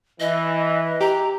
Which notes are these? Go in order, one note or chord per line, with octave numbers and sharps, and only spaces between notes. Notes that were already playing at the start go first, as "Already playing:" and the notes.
E3 D#5
G4 A#5